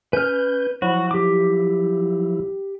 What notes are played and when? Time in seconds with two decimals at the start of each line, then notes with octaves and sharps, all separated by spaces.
0.13 C#4 B4 F6 G6
0.82 F3 F#3 E4 F#4
1.11 G4 D6